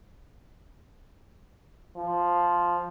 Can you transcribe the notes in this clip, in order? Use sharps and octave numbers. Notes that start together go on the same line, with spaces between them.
F3